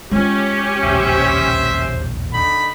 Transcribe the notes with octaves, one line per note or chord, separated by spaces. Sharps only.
G#3 C#4 F4 G4
E1 A#1 D#2 C5 E5
D3 D#4 B5